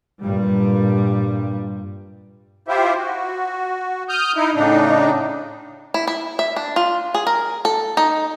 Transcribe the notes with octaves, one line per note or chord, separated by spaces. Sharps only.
G2 A#2 G3
E4 F4 G4 C5 E5
F#4
D#6 F6 G6
D#4 E4
A2 C#3 D4 D#4
E4
E4
E5
D4
F4
G#4
A#4
A4
D#4